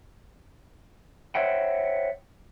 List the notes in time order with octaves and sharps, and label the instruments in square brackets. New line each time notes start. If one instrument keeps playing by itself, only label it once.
[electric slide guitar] C5 C#5 E5 F#5 G5